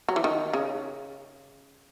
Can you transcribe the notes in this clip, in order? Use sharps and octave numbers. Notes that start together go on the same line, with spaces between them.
F#3
E3
D#3
C#3